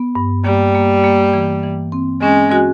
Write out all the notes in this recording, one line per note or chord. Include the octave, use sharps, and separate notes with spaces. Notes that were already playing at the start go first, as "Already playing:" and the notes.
Already playing: B3
G2
G3 A#3
A#3
A#3
E3
E3
C4
G#3 C#4
F#4